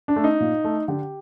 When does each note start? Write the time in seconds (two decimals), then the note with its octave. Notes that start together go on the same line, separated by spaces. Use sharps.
0.08 D4
0.16 A3
0.24 D#4
0.40 A#2
0.65 A3
0.88 D3 G4